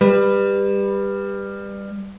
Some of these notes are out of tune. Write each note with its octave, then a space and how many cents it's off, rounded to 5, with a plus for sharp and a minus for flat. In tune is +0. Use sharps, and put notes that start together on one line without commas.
G3 +20 B4 +0